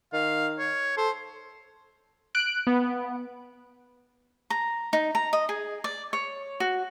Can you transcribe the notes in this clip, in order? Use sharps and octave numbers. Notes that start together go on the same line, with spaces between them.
D#3 F5
C#5
A4 C5
F#6 D7
B3
A#5
D#4
A#5
D#5
G#4
D5
C#5
F#4